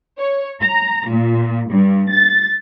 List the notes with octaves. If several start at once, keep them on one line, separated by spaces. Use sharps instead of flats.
C#5
A#5
A#2
G2
A6